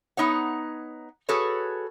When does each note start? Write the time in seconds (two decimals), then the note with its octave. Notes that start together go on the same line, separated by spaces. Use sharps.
0.17 B3 D#4 C#5 F#5
1.29 F#4 G#4 A4 B4 C#5